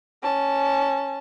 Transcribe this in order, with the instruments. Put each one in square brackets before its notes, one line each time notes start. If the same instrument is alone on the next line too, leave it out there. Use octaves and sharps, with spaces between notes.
[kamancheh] C#4 A5